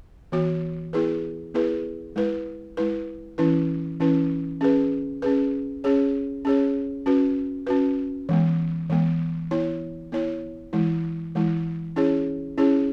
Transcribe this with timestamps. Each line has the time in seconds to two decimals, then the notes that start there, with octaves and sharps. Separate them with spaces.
0.32 E3 B3 F#4 C#5
0.93 B3 E4 G#4 B4
1.54 B3 E4 G#4 B4
2.16 G#3 E4 B4
2.77 G#3 E4 B4
3.38 E3 C#4 E4 B4
4.00 E3 C#4 E4 B4
4.61 C#4 G#4 B4
5.22 C#4 G#4 B4
5.84 C#4 G#4 C#5
6.45 C#4 G#4 C#5
7.06 C#4 F#4 B4
7.67 C#4 F#4 B4
8.29 E3 G#3 B3
8.90 E3 G#3 B3
9.51 B3 E4 C#5
10.12 B3 E4 C#5
10.73 E3 G#3 E4
11.35 E3 G#3 E4
11.96 C#4 E4 G#4 C#5
12.58 C#4 E4 G#4 C#5